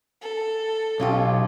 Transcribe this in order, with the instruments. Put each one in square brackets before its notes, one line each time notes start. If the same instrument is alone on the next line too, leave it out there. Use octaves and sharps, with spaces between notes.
[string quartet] A4
[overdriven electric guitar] B1 [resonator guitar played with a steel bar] C#4 F4 G4